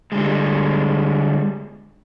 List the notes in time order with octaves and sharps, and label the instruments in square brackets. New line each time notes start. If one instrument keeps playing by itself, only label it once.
[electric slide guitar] D3 G3 G#3